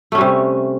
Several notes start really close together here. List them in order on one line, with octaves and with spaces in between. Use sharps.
A3 C#4 G3 C3